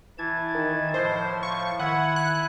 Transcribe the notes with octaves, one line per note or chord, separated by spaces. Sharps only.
E3 E4 A5 G#6
D#3 D#5
A2 F3 C5
F5 C#6
D#3 E4 E5 F#5 G#5
F#6